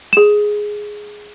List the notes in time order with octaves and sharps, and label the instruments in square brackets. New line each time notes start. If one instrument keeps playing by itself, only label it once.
[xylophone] G#4 E7